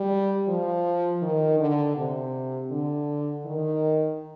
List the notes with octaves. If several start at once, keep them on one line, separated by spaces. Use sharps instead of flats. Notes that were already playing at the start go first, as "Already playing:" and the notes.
Already playing: G3
F3
D#3
D3
C3
D3
D#3